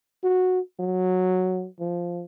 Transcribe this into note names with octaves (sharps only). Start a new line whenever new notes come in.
F#4
F#3
F3